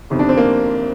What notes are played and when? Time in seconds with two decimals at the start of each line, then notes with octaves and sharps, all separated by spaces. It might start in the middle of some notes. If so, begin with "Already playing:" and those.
0.10 G1 F2 C3 D#3
0.19 D4
0.29 C4
0.37 A#3